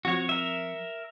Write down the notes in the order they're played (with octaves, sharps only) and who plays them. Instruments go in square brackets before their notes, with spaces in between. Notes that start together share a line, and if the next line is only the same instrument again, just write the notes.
[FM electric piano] F3 C4 C#7 [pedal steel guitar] F#4 C#5
[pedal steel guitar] A#4 E5